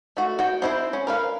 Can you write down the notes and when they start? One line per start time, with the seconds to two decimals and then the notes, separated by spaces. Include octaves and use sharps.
0.17 A3 F#4
0.39 F#4 G5
0.62 C4 E4 C5
0.93 C#4
1.07 A#4 B4 F5